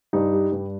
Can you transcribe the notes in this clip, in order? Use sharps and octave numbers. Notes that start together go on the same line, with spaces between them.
G2 D#4 G4
G3
G2